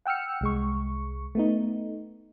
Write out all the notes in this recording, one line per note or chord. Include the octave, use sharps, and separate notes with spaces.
F#5 G5 E6 F6 C#7
C2 G#3 C#6
A3 B3 D#4